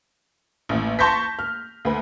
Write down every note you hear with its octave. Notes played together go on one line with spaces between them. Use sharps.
A1 D#2
A5 C6 C#6 G6 A#6 B6
F6
D2 B4